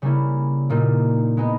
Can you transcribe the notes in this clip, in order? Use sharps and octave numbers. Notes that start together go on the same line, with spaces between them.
C#3 G3 A#3 C#4 E4
A#2 G3 A#3 D#4
G#3 B3 D#4